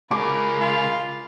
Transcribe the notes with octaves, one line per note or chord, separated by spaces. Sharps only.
C#2 G#4 A#4 B5 D6
F4